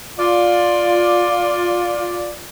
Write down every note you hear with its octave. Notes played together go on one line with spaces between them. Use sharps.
F4 D5